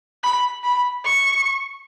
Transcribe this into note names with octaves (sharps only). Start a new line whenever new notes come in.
B5
B5
C#6